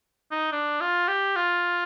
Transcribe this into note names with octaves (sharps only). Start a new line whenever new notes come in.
D#4
D4
F4
G4
F4